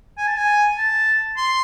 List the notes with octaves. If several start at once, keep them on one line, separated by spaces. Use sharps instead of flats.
G#5
A5
G#5
A5
C6